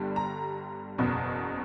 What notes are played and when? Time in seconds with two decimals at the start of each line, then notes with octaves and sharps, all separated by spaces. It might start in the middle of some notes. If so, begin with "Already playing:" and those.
Already playing: G1 G2 D3 G3
0.16 A#5
0.98 F#1 E2 B2